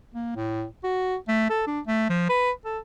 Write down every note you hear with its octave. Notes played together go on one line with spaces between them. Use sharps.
A#3
A2
F#4
A3
A4
D4
A3
F3
B4
A4